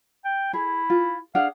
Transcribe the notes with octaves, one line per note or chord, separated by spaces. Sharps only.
G5
E4 G#4
F4
D4 G#4 F5 F#5